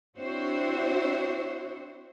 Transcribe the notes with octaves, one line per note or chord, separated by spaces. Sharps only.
C4 D4 E4 F#4 C5 C#5